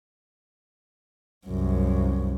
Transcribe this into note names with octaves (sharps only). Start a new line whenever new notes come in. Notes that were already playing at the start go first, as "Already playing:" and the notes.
C2 F#2